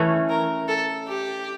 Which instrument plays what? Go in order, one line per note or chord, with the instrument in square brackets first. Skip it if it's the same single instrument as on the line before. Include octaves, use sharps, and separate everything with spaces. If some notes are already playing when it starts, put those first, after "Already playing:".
Already playing: [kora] E3 A3 C#4
[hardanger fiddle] A#4
A4
G4